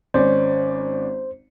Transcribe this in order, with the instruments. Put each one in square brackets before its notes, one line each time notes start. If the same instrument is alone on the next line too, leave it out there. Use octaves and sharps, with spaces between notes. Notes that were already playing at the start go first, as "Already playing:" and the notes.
[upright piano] G#1 C#4 D5 [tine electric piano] C5